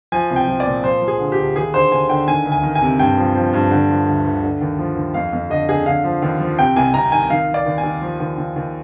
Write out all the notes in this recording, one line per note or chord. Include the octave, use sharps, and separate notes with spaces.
F3 G#5
C2
G5
F3
D5
A#2
F3 C5
F3
G#4
D3
G4
D2
D#2 G#4
D3 C5
D#2 G#5
D3 G5
D#3 G#5
D2
G#5
D#3
G#5
C3
G2 G5
F3
F3
G2
D3
F3
D2
D2
D3
D#2
F3
D#2
F2 F5
F2
D3 D#5
D3 G#4
D3 F5
F3
D#2
F3
C3 G5
C2 G#5
C2 A#5
D#3 G#5
D#3 F5
D#3
D5
D#2
G#5
D#2
F3
D#2
D#2
D#2